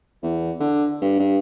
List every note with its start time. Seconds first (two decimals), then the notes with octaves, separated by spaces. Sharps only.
0.23 E2
0.60 D3
1.02 G2
1.19 G2